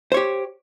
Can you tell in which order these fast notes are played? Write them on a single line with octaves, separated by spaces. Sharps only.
C5 C#5 G4